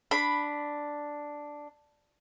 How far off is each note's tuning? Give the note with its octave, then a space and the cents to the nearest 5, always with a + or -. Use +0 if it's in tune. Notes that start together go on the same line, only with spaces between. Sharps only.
D4 +0 B5 +0